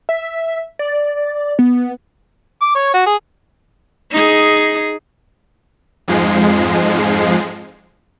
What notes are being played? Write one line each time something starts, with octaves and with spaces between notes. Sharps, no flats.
E5
D5
B3
D6
C#5
F#4
G#4
D#4 G#4
F2 G#2 F3 G#3 C7